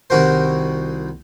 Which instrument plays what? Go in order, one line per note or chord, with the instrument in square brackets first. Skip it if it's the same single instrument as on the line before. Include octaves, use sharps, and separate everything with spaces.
[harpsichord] C2 D#3 F#4 A#4 C5